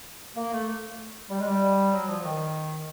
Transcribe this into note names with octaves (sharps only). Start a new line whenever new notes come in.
A#3
A3
G3
G#3
G3
F#3
F3
D#3